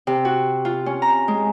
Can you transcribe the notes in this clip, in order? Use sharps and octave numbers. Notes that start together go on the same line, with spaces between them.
C3
F#4
F4
C#4
A#5
G#3